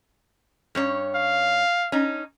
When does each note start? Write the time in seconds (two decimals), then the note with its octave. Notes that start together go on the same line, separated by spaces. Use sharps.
0.75 G2 C#4 C#5
1.15 F5
1.92 C#4 D#4